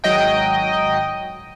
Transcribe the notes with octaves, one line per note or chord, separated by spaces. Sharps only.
G#1 F#3 D#5 G5